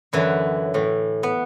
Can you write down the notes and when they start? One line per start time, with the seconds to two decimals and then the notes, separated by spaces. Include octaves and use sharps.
0.13 F#2 D3 E3 F#3 E4
0.74 A2 E3
1.23 B3